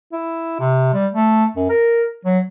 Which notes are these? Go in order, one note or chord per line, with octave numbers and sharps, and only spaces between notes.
E4
C3
G3
A3
F#2
A#4
F#3